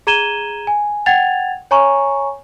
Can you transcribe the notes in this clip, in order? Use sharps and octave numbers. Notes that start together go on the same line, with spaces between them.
G#4 A#5 G#6 D#7 E7 G7
G#5
F#5 G5 G#6 A6 F7
C#5 G#5 A#5 C#6